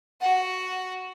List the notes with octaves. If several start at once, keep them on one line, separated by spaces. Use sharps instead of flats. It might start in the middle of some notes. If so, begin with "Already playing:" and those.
F#4 F#5